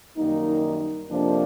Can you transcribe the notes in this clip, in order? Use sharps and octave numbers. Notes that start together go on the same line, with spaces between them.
F#2 D#3 G3 A#3 D#4
F2 C3 F3 A#3 D4